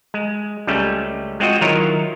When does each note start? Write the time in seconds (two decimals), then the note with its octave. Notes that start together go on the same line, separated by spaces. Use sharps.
0.14 G#3
0.67 C#2 C#3 G3 A3 C#4
1.40 G#3 C4 F4 F#4 D#5
1.61 D#3 F#3 E4 F4 A#4 C#5